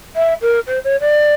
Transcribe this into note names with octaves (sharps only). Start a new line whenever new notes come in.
E5
A#4
C5
C#5
D5